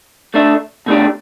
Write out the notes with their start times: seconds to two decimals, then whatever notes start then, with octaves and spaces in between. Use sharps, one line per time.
0.34 A3 D4 A4 E5
0.86 B2 A3 D4 G4